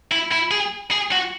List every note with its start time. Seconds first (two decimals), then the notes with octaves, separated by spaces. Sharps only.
0.12 E4
0.32 E4
0.51 G#4
0.91 G#4
1.12 F#4